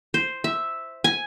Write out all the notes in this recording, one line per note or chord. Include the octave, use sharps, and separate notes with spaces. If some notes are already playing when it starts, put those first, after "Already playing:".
C5
E5
G#5